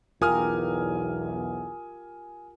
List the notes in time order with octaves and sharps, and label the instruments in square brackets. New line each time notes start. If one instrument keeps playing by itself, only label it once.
[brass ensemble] B1 E2 [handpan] F4 G4 A#4 [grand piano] G#5 D#6 F6